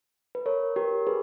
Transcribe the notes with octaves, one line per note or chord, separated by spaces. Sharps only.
B4
A#4 C#5
G4 A#4
G#4 B4